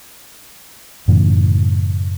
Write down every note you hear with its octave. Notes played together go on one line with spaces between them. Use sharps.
F#2 A2 C#3 E3